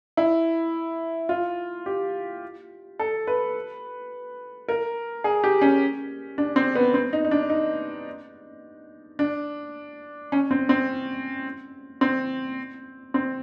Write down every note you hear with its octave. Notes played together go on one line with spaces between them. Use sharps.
E4
F4
G4
A4
B4
A#4
G#4
G4
C#4
D4
C4
B3
C4
D#4
D#4
D4
D#4
D4
C#4
C4
C4
C4
C4